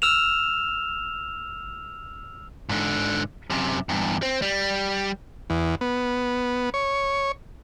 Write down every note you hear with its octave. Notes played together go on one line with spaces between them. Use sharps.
E6 F6 E7 F7
G#2 D3
F#2 C3
E2 G2
C4
G3
E2
B3
C#5